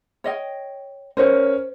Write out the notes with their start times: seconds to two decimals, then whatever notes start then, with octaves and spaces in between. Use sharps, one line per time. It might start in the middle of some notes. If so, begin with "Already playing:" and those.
0.24 C#5 D#5 G5
1.17 C#4 A#4 C5 C#5